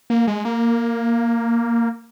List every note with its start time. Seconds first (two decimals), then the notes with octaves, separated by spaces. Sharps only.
0.10 A#3
0.27 G#3
0.45 A#3